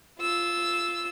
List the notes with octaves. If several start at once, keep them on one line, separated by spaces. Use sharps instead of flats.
F4 E6